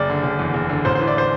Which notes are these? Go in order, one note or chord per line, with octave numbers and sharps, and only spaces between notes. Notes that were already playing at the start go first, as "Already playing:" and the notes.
Already playing: F#1 D5
D3
F#1
E2
F#1
D3
A1 C5
E3 C5
D5
C5